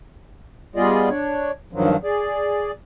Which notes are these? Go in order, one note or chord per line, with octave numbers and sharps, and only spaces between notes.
G3 B3 F4 G#4 D5 D#5
D4 C#5
G2 D#3 F3 F#3
G#4 D5